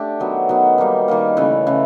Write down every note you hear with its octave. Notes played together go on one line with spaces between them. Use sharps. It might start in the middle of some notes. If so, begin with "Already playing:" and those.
Already playing: A3 D4 G4
D#3 F#3 B3
D#3 F#3 B3
D#3 G3 A#3
D#3 G3 A#3
C#3 E3 A3
C#3 E3 A3